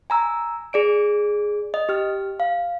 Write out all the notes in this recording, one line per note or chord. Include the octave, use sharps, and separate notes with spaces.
G#5 A#5 E6
G#4 D5 D7
D#5
G4 F6
F5